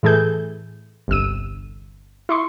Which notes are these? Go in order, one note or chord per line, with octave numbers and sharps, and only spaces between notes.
A2 E3 G#4 A4 G6
G1 C2 E6 D#7
E4 C6 C#6